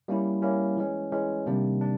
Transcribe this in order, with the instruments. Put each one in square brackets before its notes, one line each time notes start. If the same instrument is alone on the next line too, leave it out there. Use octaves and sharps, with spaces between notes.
[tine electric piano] G3 A#3 C#4 E4
G3 A#3 C#4 E4
E3 G#3 C#4
E3 G#3 C#4
C3 D#3 G3 A#3 D4
D4